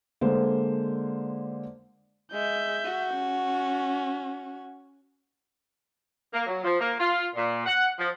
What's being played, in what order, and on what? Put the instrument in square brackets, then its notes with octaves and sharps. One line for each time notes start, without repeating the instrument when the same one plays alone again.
[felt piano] D3 G#3 A#3 A4 C5
[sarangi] G#3 [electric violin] E5 G6
[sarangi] F#4
[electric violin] C#4
[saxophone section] A#3
F#3
F3
A#3
F4
A#2
F#5
F3